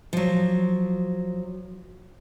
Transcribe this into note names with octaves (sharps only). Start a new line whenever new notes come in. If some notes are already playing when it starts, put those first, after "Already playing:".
F3 F#3